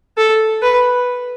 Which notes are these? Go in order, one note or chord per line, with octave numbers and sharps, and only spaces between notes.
A4
B4